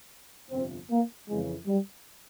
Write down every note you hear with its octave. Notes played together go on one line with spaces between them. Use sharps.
G1 F2 C3 F3 C4
A#3
F2 C#3 E3 G#3
G3